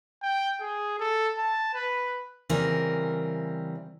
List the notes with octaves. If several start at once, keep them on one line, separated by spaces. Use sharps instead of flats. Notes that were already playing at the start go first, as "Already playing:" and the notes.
G5
G#4
A4
A5
B4
C#3 E3 G3 C4 A#4